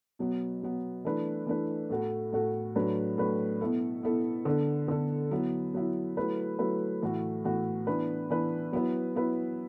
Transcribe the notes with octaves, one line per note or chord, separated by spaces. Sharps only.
B2 F#3 B3
B2 F#3 B3
E3 A3 D4 B4
E3 A3 D4 B4
A2 A3 F#4 A4
A2 A3 F#4 A4
A2 F#3 D4 B4
A2 F#3 D4 B4
B2 B3 E4 A4
B2 B3 E4 A4
D3 B3 D4 A4
D3 B3 D4 A4
F#3 B3 E4
F#3 B3 E4
F#3 A3 E4 B4
F#3 A3 E4 B4
A2 E3 A3 F#4
A2 E3 A3 F#4
E3 B3 D4 B4
E3 B3 D4 B4
F#3 B3 E4 B4
F#3 B3 E4 B4